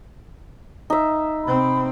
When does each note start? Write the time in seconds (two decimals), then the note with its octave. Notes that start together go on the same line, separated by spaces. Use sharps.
0.90 D#4 E5
1.44 C3 C4 B5